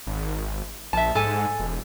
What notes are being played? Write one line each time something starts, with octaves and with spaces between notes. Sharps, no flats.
G#1
A#1 E5 A5
G#2 A4 G#5
E1